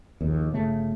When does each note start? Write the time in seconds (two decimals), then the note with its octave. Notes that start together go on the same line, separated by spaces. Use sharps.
0.21 A#1 D#2
0.54 G1 C#3 A3